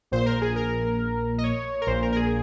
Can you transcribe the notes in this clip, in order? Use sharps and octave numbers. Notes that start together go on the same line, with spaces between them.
A#1 A#2 C5
A#4
G#4
A#4
D#5
C#5
A#4
A#1 A#2 C5
A#4
A#4
G#4